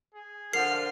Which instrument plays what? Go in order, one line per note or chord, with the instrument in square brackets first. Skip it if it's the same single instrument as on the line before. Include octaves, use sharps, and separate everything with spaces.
[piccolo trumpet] G#4
[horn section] D3 F3 F4 [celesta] A#4 F#5 [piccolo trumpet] F6 [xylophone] C7